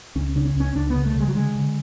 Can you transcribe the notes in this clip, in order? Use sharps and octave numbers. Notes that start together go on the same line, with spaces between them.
C#2 C#4
C#3 D4
C#4
C#2 C#4
C#2 D4
B3
C#3
A3
C#3 G#3
F#3
D3 G#3
D3